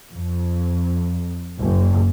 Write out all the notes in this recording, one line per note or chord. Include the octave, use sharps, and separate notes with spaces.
F2
F#1